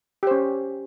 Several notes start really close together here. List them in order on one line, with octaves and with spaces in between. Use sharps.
G4 C5 C#4